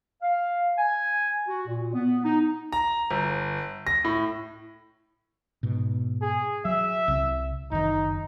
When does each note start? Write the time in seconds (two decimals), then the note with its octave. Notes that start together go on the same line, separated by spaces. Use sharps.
0.23 F5
0.77 G#5
1.48 F#4
1.67 A#2
1.94 B3
2.24 D#4
2.73 A#5
3.10 G1
3.87 A#6
4.04 A2
5.63 G#2 B2
6.22 G#4
6.65 F#3 E5
7.08 C2
7.71 F#1 D#3 D#4